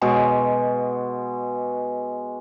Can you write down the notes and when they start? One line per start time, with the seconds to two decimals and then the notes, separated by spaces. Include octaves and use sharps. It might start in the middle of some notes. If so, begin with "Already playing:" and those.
0.01 B2 G#3 C#6